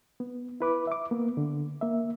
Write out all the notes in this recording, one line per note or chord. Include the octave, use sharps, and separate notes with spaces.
B3
E4 B4 D6
E5 D6
A#3 B3
D3
A#3 E5